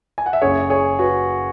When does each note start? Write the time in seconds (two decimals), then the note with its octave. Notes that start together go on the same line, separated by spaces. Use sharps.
0.18 G#5
0.26 F#5
0.33 E5
0.42 F#1 F#2 C#3 G#4 C#5
0.70 G#4 C#5
0.99 F#4 B4